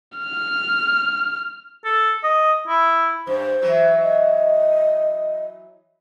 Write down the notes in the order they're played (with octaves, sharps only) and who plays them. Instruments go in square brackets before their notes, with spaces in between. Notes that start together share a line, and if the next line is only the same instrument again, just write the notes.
[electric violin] F6
[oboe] A4
D#5
E4
[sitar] G2 [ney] C5
[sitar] E3 F#3
[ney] D#5